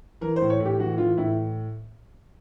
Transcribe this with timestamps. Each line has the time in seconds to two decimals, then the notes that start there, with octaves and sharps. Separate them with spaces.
0.21 E3 A#4
0.36 C5
0.41 A2
0.50 C#5
0.60 A2
0.65 G4
0.79 E3 F#4
0.98 E3 F4
1.17 A2 E4